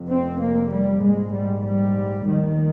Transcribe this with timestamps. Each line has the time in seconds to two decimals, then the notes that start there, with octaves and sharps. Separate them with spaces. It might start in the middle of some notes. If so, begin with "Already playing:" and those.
Already playing: F1 F2 C3
0.08 C4
0.39 A#3
0.71 G3
1.02 A#1 G#2 G#3
1.33 G3
1.64 G3
2.26 F1 D#2 D#3